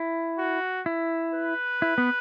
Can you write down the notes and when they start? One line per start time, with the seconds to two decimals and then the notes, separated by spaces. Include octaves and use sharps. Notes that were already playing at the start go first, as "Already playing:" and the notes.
Already playing: E4
0.38 F#4
0.86 E4
1.34 B4
1.82 E4
1.98 B3